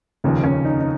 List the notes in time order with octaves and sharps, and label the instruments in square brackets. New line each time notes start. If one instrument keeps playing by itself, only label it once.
[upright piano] F1 D#2 C#3 F3
C#4
D#4
D#4